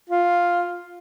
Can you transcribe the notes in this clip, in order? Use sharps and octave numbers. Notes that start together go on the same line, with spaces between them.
F4